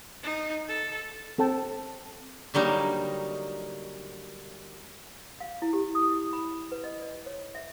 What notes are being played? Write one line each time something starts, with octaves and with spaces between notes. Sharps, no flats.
D#4
A4
C4 A4 G5 A5
D3 F#3 G3 A#3 D#4
F5
E4
G4
D#6
E4
B5
B4
D#5
D5
C#5
E5